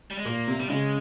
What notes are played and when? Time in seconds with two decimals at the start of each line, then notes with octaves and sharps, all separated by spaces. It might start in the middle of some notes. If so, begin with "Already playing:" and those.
0.11 G3
0.18 G#3
0.25 A#2 A#3
0.47 C3
0.60 C3 G3
0.69 C#3 G#3